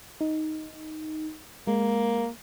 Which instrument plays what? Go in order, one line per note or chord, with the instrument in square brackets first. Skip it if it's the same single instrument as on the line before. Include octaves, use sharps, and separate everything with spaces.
[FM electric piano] D#4
[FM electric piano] G#3 [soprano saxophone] A#3